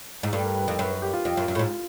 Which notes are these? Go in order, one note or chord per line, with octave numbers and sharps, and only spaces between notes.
G#2
G2 A4
A#4
B4
F2 A#4
F#2 B4
B4
G4
F4
F2 F4
F#2
F#2
A2
G#2